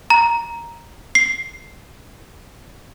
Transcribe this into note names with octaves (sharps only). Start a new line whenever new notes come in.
A#5
C7